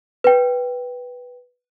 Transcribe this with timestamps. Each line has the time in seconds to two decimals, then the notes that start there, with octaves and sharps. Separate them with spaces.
0.24 B4 G5